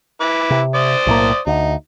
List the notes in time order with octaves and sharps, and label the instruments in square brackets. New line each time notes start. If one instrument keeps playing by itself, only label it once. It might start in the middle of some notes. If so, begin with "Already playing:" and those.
[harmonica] E4 B4 D6
[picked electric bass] C3
[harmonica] C5 D5 D#6
[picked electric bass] B1 A2 A#3
[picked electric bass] D2 [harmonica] D#4